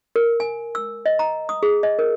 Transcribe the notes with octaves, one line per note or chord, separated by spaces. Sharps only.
A#4
G#5
E6
D#5
A#5
D#6
G#4
D#5
A#4